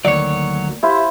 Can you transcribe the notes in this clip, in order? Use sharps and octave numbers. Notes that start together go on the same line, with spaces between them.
D2 D#3 F#3 A#3 C#5 D5
E4 G4 C5 E5 F5 C6